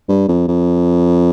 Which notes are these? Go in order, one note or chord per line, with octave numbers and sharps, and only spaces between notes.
G2
F2
F2